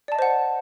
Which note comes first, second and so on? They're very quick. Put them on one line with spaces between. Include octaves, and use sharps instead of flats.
D5 A5 D#5 C5 F#5